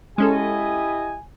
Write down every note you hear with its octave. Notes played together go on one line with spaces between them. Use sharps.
G#3 C#4 E4 G4 A4 D#5 G#5